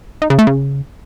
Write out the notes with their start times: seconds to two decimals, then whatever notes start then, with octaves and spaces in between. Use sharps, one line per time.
0.22 D#4
0.30 C#3
0.39 A3
0.47 C#3